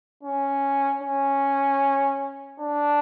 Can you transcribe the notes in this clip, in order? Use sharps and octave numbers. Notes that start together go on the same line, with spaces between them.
C#4
C#4
D4